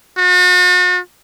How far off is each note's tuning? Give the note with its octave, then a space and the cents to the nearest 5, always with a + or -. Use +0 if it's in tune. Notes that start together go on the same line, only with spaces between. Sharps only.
F#4 -45